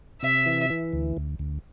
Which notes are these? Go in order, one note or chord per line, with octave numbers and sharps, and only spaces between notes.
C3 E5
E3
E3
D2
D2
D2